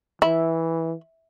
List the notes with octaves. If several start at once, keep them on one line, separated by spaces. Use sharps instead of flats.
E3 E4